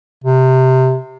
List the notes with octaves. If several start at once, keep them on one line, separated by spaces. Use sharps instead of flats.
C3